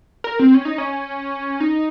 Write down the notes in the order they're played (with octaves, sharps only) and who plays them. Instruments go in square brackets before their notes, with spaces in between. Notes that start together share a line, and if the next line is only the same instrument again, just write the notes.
[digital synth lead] A#4
C4
C#4
D#4
C#4
D#4